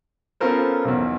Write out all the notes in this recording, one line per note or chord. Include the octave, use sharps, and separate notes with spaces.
B3 C#4 F4 A4 A#4 C5
B1 E2